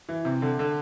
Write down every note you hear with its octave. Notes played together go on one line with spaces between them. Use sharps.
E3
C3
D3
D3